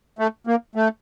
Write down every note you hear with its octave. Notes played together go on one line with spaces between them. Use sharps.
A3
A#3
A3